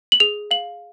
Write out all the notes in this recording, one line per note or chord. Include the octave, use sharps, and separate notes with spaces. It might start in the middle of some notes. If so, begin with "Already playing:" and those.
F#7
G#4 F7
F5 F#7